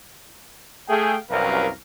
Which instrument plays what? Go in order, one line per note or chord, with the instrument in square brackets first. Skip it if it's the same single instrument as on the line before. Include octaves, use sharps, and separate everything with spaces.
[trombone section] A3 G#4 [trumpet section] F5 G5
[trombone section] C2 F#2 [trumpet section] A#4 B4 F5